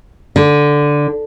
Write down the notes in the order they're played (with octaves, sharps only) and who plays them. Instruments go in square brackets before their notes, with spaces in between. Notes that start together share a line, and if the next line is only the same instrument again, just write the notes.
[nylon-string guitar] D3